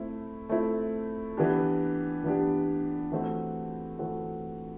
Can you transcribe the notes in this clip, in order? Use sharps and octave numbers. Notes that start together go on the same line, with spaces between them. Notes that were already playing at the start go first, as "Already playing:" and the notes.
Already playing: A3 C4 E4
A3 C4 E4
E3 B3 D4 G4
E3 B3 D4 G4
E3 A3 C4 F#4
E3 A3 C4 F#4